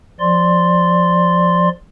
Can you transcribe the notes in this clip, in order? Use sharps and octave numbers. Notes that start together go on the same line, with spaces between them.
F3 D5 C6